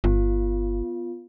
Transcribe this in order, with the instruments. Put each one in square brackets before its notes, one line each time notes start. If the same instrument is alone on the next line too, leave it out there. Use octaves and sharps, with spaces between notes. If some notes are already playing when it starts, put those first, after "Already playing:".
[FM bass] G1 [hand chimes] B3 F4